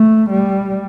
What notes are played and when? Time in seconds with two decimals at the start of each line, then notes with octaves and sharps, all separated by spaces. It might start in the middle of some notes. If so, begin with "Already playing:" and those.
Already playing: A3
0.30 G3